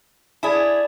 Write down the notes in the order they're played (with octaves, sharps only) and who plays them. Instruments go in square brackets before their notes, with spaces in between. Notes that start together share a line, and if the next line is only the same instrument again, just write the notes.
[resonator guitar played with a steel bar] E4 G#4 [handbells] D5 A5